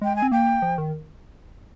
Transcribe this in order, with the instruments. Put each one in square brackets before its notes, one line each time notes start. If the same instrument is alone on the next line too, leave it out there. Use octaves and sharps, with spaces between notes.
[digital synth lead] G#3 [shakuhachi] G5
[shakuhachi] G#5
[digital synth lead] C4
[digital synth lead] A#3 [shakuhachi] G5
[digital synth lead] F3
D#3